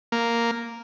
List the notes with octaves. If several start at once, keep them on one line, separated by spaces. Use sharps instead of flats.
A#3